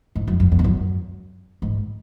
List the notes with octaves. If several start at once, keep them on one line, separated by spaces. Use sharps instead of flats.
G#2
F#2
F#2
E2
G#2
F#2
G#2